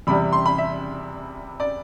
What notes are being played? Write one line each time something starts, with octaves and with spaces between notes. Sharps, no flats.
E2 C3 G3 B5
C6
B5
E5
D5